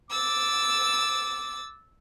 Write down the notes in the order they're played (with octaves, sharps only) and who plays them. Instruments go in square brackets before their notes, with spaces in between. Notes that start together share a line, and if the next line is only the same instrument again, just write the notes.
[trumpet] D6 [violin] E6 A6